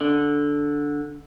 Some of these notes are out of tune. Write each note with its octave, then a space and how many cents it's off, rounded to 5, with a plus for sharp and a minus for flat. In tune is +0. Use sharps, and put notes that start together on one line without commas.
D3 -5